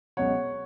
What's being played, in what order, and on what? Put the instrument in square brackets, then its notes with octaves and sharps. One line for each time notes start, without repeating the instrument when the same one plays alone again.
[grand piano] C#2 B2 F#3 C#5 F#5